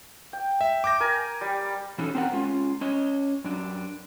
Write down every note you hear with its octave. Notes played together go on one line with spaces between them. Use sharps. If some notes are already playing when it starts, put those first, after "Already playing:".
G5
E5
D6 G6 A#6
A#4 G#5
G3
B2 E3 C#4 D#4 E4 A4
C4 C#4 G4 A#4 F#5
G#3 C#4 F4
C#4 C#5 D#5
F#2 D4